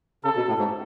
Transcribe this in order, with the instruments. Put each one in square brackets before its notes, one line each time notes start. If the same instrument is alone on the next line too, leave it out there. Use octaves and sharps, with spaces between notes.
[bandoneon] C#3 [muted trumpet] A4
[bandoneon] B2
A2
G#2